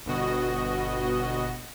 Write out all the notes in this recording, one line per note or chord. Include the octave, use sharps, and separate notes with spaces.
G1 B2 F#4 D#5